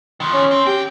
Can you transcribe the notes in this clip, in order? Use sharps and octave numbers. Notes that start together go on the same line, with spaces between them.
D#3 F3
C#4
C4
D#2 G4 G5